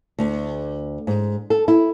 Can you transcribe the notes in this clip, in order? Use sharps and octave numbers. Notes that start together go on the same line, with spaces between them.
D2
G#2
A4
E4